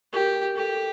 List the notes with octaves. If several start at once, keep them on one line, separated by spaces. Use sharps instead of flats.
G4 A#4
G4 A4